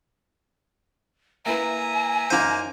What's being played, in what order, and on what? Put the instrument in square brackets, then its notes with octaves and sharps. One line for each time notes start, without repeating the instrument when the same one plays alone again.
[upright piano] A#3 E4 B4 [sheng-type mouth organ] E5 A#5 [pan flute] G#5
[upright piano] F#2 D#4 F#5 [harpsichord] A#3 C5